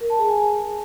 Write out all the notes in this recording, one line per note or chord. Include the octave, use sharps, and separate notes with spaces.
A#4
A5
G#4
G#5
G#4